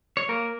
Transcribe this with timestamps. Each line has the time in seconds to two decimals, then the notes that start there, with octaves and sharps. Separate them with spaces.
0.17 C#5
0.29 A#3 A#4